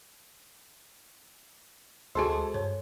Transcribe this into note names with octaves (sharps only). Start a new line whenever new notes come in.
D2 G#3 F#4 G#4 A4 C5
G2 C#5